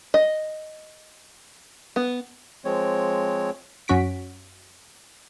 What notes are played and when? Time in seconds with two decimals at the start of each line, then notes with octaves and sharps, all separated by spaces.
0.14 D#5
1.96 B3
2.65 F3 G#3 C4 C#5
3.88 F#2 C#4 F#4 B6 D7